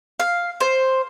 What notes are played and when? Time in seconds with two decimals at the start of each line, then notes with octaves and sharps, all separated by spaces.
0.20 F5
0.60 C5